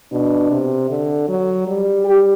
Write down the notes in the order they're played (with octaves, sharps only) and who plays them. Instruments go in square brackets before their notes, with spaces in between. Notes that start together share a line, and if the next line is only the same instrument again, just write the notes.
[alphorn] B2 [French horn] D4
[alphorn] C3
D3
F#3
G3
[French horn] G4